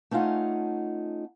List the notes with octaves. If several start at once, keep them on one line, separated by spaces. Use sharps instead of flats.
A3 C#4 D#4 F4 F#5